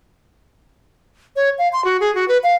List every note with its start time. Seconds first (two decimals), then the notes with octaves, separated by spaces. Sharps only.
1.36 C#5
1.58 F5
1.73 C6
1.85 F#4
2.00 G#4
2.15 F#4
2.28 B4
2.44 F5